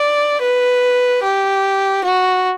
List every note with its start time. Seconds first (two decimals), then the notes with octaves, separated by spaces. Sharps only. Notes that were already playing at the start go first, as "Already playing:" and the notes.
Already playing: D5
0.42 B4
1.23 G4
2.04 F#4